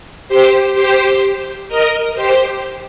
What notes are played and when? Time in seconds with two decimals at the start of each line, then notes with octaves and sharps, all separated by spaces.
0.28 G4 C5
0.74 G4 C5
1.68 A#4 D#5
2.15 G4 C5